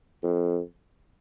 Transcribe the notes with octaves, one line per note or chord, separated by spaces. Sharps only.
F2